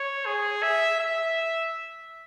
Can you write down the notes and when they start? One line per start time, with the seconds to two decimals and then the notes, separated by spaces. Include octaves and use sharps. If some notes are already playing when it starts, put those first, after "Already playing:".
Already playing: C#5
0.26 G#4
0.63 E5
1.00 E5